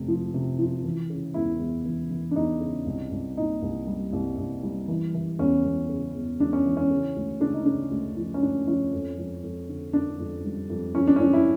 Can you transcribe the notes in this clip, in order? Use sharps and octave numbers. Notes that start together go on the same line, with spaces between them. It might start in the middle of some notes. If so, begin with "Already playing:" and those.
Already playing: F1 C3
F3
C3
F3
E3
C#3
E2 E4
E2
E3
E3
D4
E2 D#4
C#3
C2
C2
A#2 D#4
C2
G3
C2
C2
G3
E3
E3
E2 C#4
E2
C#3
E2
E2 D4
C#4
E3
C#4
C#3
D2
C#3 D4
D#4
C#3 D4
D2
F3
C#4
D2 D4
F3 C#4
F2
F2
F2
D3
D3 D4
F2
G3
F2
F3 C#4
D4
C#4
F3 D4
E4